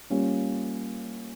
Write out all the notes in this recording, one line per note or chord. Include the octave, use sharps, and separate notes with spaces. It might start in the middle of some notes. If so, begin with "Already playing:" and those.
G3 A#3 C#4 F4